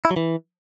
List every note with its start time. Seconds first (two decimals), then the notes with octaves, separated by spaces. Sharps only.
0.05 E4
0.11 F#3
0.16 E3